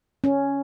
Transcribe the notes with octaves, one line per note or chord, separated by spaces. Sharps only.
C#4